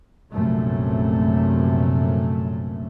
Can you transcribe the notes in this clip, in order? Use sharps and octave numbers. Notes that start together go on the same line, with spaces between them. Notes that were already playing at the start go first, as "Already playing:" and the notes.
A#1 F#2 C3 A3